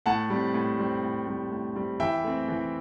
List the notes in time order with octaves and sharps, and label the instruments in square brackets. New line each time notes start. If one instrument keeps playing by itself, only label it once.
[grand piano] A2 F#5 A5
G3 C4
A2
G3 C4
A2
G3 C4
A2
G3 C4
E3 E5 G5
A3 C4
E3